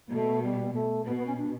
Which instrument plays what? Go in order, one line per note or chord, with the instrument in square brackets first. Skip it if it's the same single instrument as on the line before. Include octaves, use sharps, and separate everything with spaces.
[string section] B2 [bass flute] A3
[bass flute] G3
A3
[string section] B2 [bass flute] B3
[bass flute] B3
C#4
D4